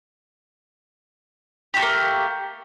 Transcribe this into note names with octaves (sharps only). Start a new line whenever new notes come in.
A3 A#3 F#4 G4